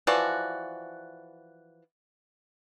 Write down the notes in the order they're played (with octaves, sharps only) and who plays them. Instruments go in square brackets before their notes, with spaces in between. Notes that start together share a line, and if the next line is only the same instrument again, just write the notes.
[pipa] E3 F3 F#4 D5